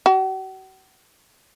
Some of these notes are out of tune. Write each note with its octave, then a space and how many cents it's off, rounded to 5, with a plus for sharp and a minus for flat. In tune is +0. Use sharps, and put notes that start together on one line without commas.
F#4 +45